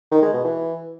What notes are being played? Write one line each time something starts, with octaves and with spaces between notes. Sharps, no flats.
D#3
G#3
B2
E3